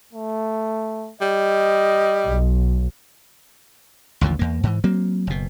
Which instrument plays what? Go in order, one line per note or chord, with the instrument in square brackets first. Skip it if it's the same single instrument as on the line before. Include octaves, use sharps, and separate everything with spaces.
[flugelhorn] A3
[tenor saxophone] G3 [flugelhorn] D#5
[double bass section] B1
[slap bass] A1 D#2 D3 F3
E2 A#3
G#2 E3
F#3 A#3 C4
F#1 B2